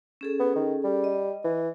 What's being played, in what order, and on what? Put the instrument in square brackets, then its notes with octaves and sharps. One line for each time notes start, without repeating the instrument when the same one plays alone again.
[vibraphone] C#4 G#4 A4
[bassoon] B3
D#3
G3
[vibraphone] D#5
[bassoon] E3